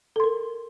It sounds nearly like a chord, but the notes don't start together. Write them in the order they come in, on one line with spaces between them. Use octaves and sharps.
A4 C6 A#4